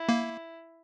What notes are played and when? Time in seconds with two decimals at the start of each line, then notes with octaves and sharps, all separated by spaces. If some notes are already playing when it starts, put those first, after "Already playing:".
Already playing: E4
0.09 A#3